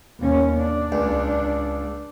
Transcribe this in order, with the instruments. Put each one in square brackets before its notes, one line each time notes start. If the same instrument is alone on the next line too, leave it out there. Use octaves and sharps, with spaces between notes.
[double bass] D#2 C#4
D4
[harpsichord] C#2